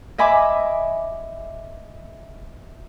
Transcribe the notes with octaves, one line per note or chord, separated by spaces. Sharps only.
D#5 E5 G#5 B5 D6